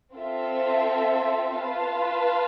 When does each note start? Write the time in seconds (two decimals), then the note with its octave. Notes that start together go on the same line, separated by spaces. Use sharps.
0.14 C4 F4 A4 E5
1.59 F4 B4 F5 A5